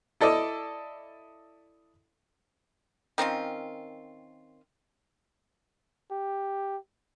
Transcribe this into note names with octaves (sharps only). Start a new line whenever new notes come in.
E4 A4 D5 D#5
D#3 C4 C#4 F4
G4